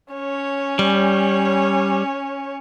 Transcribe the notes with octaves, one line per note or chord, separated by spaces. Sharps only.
C#4 C#5
G3